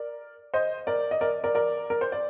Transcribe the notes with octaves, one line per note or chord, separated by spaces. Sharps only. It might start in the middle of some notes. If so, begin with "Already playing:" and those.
Already playing: A#4 D5
C5 D#5
A#4 D5
D#5
A#4 D5
A#4 D5
A#4 D5
A#4
C5
D5